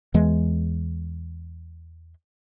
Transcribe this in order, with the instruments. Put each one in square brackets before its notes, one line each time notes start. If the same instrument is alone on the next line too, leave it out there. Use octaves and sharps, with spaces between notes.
[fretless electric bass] E2 E3 G#3